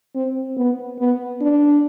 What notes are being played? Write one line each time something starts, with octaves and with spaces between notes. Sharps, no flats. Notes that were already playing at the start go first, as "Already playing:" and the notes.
C4
B3
B3
D4